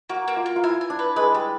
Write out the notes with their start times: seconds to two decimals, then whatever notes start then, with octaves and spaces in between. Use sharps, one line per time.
0.10 A#3 F#4
0.28 A#3
0.37 F4
0.46 A#3
0.56 F4
0.63 E4 G#5
0.81 G#5
0.90 D4
0.99 B4
1.16 G#3 B4
1.35 G3 B4